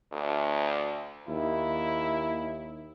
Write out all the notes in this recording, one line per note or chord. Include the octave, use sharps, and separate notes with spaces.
D2
D#2 E4